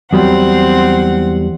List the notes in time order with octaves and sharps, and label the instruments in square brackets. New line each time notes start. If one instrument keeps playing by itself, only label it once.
[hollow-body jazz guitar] E2 F#3 G3 [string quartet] C4 F#5